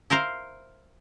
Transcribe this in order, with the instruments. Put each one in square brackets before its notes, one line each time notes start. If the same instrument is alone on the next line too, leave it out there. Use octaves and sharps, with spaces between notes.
[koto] E4 A#4 C5 F5